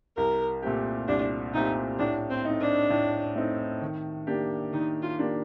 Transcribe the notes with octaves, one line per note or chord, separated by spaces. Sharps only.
C2 A#4
A#2 A3 C4 G4
C2 D4
A#2 A3 C4 D#4 G4
A2 D4
C4
A3 C4 D#4
D4
A2
A3 C4 D#4
D#3
A#3 D4 G4
D#3 D#4
F4
A#3 D4 G4